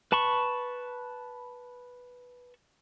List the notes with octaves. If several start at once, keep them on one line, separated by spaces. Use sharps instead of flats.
B4 A5 B5 C#6